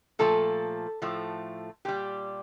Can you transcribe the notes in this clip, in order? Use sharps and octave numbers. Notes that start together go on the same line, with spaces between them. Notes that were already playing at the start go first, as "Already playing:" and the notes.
A#2 F3 A3 A4
A2 F3 A3
A#2 G3 G4